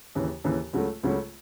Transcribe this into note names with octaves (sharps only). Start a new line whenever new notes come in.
D#2 C#3 E3
D#2 C#3 E3
C#2 C#3 F#3 A3
C#2 C#3 F#3 A3